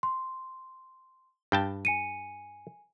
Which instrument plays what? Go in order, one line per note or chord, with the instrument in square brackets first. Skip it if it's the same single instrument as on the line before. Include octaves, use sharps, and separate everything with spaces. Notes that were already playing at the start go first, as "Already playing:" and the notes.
[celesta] C6
[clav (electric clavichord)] G2 G5 A5
[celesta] G#5 C#7 D#7